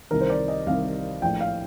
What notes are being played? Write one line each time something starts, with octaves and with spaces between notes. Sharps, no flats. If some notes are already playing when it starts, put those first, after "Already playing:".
C2 C3 D#3 A#4
C5
D5
D#5
C2 C3 D#3 F5
A#1 A2 G5
F5